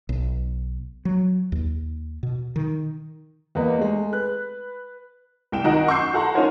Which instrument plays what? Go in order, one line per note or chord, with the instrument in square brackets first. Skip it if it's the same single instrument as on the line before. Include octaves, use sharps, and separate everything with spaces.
[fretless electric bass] B1
F#3
D#2
B2
D#3
[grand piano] E2 A#3 B4 D#5
G#3 A3
B4 F#6
[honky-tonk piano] C2 G5 E7
D#3 F#4 D#5 A#5 F#6 D7
C6 C#6 E6 G6 C7
F#4 A4 F#5 A5 A#5 C6
C#4 D#4 F4 A#4 C5 C#5